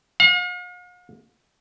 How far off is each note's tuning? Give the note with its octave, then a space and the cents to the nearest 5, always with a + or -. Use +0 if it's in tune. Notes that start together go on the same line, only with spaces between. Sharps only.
F5 +45